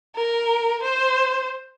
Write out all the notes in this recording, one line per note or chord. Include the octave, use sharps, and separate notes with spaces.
A#4
C5